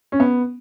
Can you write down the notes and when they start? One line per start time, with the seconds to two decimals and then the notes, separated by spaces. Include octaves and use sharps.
0.12 C#4
0.20 B3